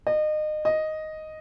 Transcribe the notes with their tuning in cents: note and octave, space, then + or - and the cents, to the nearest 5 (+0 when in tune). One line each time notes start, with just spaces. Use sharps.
D#5 -30
D#5 +0